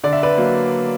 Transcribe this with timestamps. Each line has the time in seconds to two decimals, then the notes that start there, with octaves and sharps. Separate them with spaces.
0.04 D3 D5
0.13 E5
0.23 B4 D5
0.38 F#3 A#3